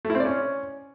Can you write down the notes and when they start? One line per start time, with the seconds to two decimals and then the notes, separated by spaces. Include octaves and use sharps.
0.05 A3
0.10 E4
0.15 C4
0.20 D5
0.25 C#4